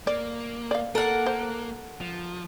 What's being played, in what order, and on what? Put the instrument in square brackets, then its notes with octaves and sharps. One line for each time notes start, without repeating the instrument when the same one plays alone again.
[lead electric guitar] A#3 [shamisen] D5
[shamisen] D5 F5
[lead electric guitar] A#3 [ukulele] A4 [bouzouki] A#4 F#5
[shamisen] C5
[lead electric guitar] F3